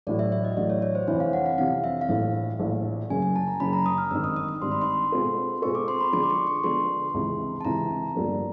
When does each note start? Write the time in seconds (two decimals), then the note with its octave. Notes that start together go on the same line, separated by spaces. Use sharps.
0.07 A1 A2 F#3 D5
0.19 E5
0.32 E5
0.44 D#5
0.57 A1 A2 F#3 D5
0.70 C#5
0.82 C#5
0.95 C5
1.08 F2 C3 E3 C#5
1.20 F5
1.33 F#5
1.46 F5
1.58 F2 C3 E3 F5
1.84 E5
2.01 F5
2.09 A#1 A2 E3 E5
2.60 A#1 A2 E3
3.10 F#1 F#2 C#3 G#5
3.22 G#5
3.36 A5
3.48 A#5
3.60 F#1 F#2 C#3 B5
3.73 A#5
3.86 D#6
3.98 F6
4.11 G#1 G2 D#3 E6
4.24 D#6
4.36 D#6
4.49 D#6
4.62 G#1 G2 D#3 C6
4.72 B5
4.82 C6
5.12 B2 G#3 C4 F4 A4
5.62 B2 G#3 C4 F4 A4 C#6
5.75 D6
5.88 C6
6.01 B5
6.13 D3 F3 G#3 B3 C6
6.23 D6
6.30 C#6
6.47 C#6
6.64 D3 F3 G#3 B3 C6
7.14 C#2 C3 E3
7.61 A5
7.65 C#2 C3 E3 A#5
8.15 G1 G2 D3 F3 A#3